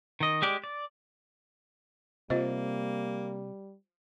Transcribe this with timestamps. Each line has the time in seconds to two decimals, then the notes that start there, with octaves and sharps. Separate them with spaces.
0.20 D#3 D#5
0.42 G#3 G4 D5
0.64 D5
2.30 C3 G3 A#3 F4 C5 D#5